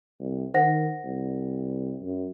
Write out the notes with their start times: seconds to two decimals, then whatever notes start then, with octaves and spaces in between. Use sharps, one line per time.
0.20 C2
0.54 D#3 C5 F#5 A#6
1.04 C2
2.01 F#2